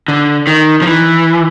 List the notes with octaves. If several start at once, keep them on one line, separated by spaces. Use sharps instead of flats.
D3
D#3
F3
E3